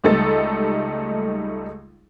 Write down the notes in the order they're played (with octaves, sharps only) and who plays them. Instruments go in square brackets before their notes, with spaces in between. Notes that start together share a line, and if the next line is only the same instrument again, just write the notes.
[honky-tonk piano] C#2 G3 A3 D#4 A4 A6